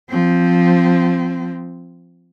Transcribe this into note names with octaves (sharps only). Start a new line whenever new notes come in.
F3 C4